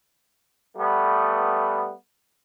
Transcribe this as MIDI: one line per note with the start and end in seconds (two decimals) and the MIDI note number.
0.77 1.92 55
0.77 1.92 57
0.77 1.92 59